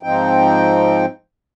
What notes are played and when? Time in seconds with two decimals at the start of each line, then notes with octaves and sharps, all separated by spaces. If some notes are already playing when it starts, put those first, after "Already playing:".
0.03 G#2 F3 C4 D#4 G5